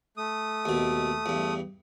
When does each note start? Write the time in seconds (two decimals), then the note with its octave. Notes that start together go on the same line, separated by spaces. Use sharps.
0.17 A3 D#6
0.65 D#2 B2
1.26 E2 G2